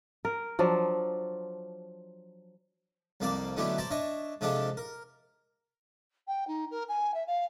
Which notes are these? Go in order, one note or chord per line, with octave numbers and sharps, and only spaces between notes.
A#4
F3 F#3 D4
C2 F2 A#3 C4 D5 A5
B2 D3 F#3 A3 E4 G4
C5 D5 A5 A#5
D4 C#5 D#5 E5
C3 F3 G#3 D4 G4 A4
A#4
G5
D#4
A#4
G#5
E5
F5